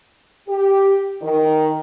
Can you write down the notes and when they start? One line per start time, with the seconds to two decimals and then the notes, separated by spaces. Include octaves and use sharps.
0.48 G4
1.22 D#3